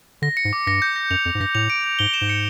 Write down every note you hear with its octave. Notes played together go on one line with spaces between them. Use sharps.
D3 A#6
C#7
G#2
D6
G2 A#6
G6
A#6
F#2 F7
F2 F7
G#2
G2 A#6
A2 F7
D7
D7
G#2 G7
E7
G#2
C#7